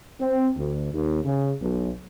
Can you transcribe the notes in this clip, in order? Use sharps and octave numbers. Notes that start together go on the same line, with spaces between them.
C4
D2
D#2
C#3
B1